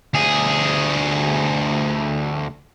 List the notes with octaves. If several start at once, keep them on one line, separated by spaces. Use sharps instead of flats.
D2 G#4